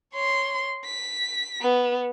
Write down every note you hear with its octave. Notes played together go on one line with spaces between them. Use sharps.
C#5 C6
B6
B3